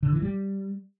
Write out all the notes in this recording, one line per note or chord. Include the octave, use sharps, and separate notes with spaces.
D3
E3
G3